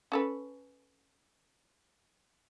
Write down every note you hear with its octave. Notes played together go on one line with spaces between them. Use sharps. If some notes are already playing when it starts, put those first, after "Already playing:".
C#4 A4 B4